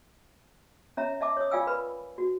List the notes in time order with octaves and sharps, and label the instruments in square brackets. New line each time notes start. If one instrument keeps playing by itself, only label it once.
[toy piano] C#4 C#5 E5 A#5
D#5 E5 A5 D6
C#5 D#6
F4 D5 F5 G5 G#5 E6
A#4 B4 B5
F#4